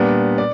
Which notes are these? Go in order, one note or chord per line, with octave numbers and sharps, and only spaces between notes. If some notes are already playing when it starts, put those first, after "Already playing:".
Already playing: A#2 G3 B3 D4
D5